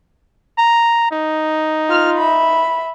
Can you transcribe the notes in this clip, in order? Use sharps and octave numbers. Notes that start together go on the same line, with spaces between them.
A#5
D#4
F4 F6
E5 B5